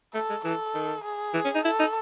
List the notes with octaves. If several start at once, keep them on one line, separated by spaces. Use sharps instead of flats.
A3 A4
G#3
E3 A4
D#3
G#4
E3
C#4
D#4
E4 A4
D#4